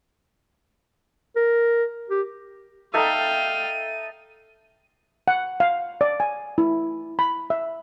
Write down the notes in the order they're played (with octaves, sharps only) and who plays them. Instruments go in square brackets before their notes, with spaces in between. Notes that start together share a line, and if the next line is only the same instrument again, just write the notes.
[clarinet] A#4
G4
[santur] D#4 A4 E5 [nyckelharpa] F5 G5 [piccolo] D#7
[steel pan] F#5
F5
D5
G#5
E4
B5
E5